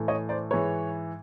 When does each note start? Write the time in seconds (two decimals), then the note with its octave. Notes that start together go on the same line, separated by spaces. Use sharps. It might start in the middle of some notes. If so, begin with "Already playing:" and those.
Already playing: A2 E3
0.08 C#5 D#5
0.29 C5 D5
0.51 G#2 E3 B4 C#5